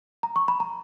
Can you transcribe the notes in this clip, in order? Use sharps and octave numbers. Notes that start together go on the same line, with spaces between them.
A#5
C#6
B5
A#5